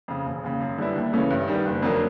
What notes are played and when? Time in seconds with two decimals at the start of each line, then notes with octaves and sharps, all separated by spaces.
0.08 F2 C#3
0.26 E1
0.43 D#2 C#3
0.60 F#2
0.78 D3 G3 B3 E4
0.95 D#2
1.13 C#3 E3 A3 C#4
1.30 G2
1.48 D#3 G3 B3
1.65 F#1
1.82 F2 D3 F#3 A#3